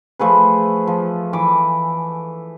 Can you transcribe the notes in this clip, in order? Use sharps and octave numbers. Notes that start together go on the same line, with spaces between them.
F3 A3 G#4 B4
F3
E3 D6